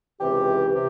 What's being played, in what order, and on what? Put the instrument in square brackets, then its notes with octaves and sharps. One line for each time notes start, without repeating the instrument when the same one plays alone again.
[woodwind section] C#2 C3 E3 G4
C3 G4